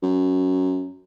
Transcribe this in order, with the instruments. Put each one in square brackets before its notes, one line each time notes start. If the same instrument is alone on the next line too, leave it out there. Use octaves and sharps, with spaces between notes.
[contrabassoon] F#2